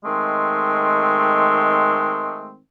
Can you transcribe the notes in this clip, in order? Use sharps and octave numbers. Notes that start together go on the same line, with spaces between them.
D#3 G#3 A3 C4